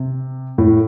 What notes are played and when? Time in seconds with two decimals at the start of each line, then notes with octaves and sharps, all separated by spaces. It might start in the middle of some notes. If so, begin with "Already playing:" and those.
Already playing: C3
0.58 A2